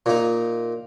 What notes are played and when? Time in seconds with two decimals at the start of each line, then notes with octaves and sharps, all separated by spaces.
0.06 A#2 D#4